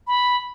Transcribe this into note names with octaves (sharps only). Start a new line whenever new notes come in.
B5